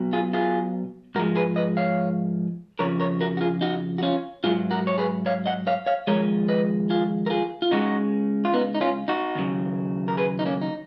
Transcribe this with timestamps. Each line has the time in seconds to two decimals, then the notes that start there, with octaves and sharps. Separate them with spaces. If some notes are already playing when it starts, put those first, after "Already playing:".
Already playing: B1 B2 F#3
0.13 F4 G#4
0.33 F4 G#4
1.15 G#2 F3 G#3 F#4 A#4
1.35 G#4 B4
1.56 B4 D#5
1.77 C#5 F5
2.79 F2 C#3 F3 A#4 C#5
3.00 A#4 C#5
3.21 F#4 A#4
3.37 F#4
3.41 F4 G#4
3.61 D#4 F#4
3.98 F#4
4.03 C#4 F4
4.44 G#2 F#3 F4 G#4
4.71 F#4 A#4
4.87 C#5
4.98 G#4 B4
5.26 C#5 F5
5.46 D#5 F#5
5.67 C#5 F5
5.86 C#5 F5
6.07 D#2 C#3 F3 G#3 A#4 C#5
6.48 B4 D#5
6.90 F4 G#4
7.26 A#4
7.30 F4 G#4
7.62 F4
7.71 C#2 C#3 G#3 D#4 F#4
8.45 F4
8.54 B3 D#4
8.75 D#4
8.81 C#4 F4
9.08 D#4 F#4
9.35 D#2 C#3 F#3
10.08 A#4
10.17 G#4 B4
10.39 D#4
10.46 A#3 C#4
10.61 D#4